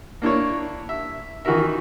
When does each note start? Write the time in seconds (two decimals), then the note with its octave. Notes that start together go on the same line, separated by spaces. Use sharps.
0.22 A#3 D4 E4 C#5
0.89 E5
1.45 D#3 E3 F#4 A#4 E5